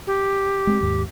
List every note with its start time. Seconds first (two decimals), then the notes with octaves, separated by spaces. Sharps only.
0.07 G4
0.67 G#3 B3 C4
0.81 D#2 G#2